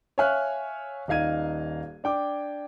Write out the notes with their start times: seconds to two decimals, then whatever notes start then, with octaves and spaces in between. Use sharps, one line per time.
0.18 C#5 E5 F5 G#5 F6 F#6
1.08 D#1 D#4 F5 G#6 D#7
2.04 D4 G5 D6